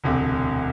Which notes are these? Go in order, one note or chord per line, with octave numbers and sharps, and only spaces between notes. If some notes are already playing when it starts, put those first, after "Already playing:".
E1 D2 C3